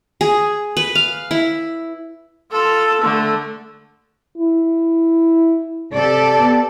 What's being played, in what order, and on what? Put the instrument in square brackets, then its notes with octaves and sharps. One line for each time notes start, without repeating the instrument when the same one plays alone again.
[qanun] G#4
B4
F5
E4
[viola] F4 A4
D3 A3
[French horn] E4
[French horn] C3 [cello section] G4 A4 D5
[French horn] B3